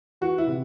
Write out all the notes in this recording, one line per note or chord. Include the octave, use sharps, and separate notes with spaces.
E3 F#4
E4
C3